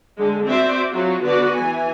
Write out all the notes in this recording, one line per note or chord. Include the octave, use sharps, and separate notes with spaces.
D3 G#3
C4 F#4 C5 D5 E5
F#3 C4 F4 F#4
D3 B3 F#4 B4 D5
E3 G#5